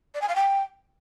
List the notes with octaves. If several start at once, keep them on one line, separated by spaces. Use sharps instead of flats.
D5
G#5
F5
G5